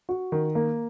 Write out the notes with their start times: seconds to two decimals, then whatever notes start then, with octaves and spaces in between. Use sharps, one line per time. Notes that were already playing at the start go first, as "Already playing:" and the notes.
0.09 F#4
0.32 D#3
0.55 A#3